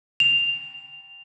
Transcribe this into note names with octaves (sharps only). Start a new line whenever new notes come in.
F7